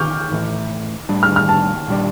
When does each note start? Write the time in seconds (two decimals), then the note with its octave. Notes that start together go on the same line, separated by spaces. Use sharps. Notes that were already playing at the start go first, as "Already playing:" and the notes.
Already playing: C#6 D6 F6 G6
0.31 A2 E3 A3
1.09 A2 G3 D4
1.23 F6
1.36 F6
1.49 A5
1.88 A#2 G3 D4